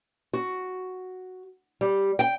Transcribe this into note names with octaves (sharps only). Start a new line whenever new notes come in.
F#4
G3
G5